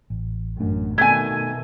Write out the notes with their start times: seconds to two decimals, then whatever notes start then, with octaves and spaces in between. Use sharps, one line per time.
0.10 A1
0.60 A1 F#2 A3 D4
0.98 B2 D#3 A3 B3 C4 G#5 G#6